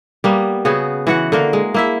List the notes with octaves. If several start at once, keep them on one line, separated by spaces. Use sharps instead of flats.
G3 A#3 B3
C#3 B3 F#4 G#4
E3 F#4 F#5
D3 A#3 A#4
G#3
A#3 E4 E5